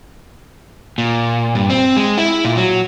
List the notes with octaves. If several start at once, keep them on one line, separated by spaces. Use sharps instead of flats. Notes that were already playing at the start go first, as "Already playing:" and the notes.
A#2
G2
C4
G#3
E4
A#2
F#3